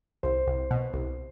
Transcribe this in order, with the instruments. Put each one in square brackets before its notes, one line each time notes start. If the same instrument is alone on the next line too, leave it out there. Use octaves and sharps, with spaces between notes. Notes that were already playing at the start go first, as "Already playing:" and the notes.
[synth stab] C2 [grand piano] C5
[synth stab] C2
B2
C2